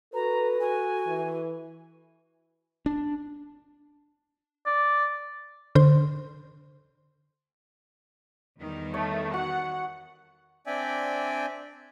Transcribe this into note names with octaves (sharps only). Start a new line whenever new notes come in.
F#4 A4 B4 A#5
F#4 G#5
E3
D4
D5
D3 C5 C6
E2 D#3 G3
A3 C#5
F#4 F#5
C4 D4 D5 E5 G5 G#5